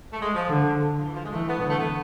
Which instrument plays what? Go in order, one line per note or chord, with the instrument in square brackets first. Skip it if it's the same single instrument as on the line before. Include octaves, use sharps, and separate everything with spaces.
[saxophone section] A3
G#3
F3
[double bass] D3
[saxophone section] F3
E3
F3
G#3
[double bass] E3 [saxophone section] A3
[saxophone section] B3
[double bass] D3 [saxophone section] B3
[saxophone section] A3
B3